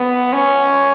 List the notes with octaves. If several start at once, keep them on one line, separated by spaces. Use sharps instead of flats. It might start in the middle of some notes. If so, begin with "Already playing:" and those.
Already playing: B3
C#4